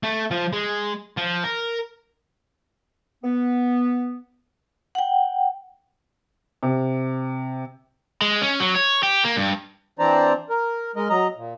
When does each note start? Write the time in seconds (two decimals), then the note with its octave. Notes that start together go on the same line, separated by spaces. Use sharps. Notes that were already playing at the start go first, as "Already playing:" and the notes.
0.03 A3
0.31 F3
0.53 G#3
1.17 F3
1.44 A#4
3.24 B3
4.95 F#5 G5
6.63 C3
8.21 G#3
8.41 C#4
8.60 F#3
8.75 C#5
9.03 G4
9.24 A#3
9.37 G2
9.99 E3 C4 D4 C5 D5 A#5
10.50 A#4
10.96 G#3 A#4 D#5
11.10 F#3 D#5 A#5
11.37 A#2